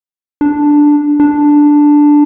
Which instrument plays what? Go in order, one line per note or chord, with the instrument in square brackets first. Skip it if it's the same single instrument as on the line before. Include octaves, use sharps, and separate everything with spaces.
[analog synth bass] D4
D4